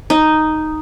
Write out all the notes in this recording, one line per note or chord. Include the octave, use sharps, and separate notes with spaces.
D#4